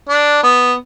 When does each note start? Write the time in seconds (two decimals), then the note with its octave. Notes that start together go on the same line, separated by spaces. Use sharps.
0.09 D4
0.43 B3